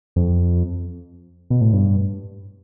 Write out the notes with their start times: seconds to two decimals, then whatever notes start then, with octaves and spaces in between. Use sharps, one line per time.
0.16 F2
1.50 B2
1.61 A2
1.73 G2